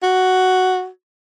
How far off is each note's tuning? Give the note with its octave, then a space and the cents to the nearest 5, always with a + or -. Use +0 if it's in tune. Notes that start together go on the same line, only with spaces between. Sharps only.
F#4 +5